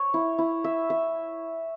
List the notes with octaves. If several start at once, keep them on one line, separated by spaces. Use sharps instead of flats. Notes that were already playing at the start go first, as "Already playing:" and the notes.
Already playing: C#5
E4
E4
E5
E5